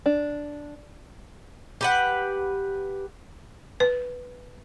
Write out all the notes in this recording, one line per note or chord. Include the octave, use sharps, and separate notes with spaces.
D4
G4 B4 F#5
B4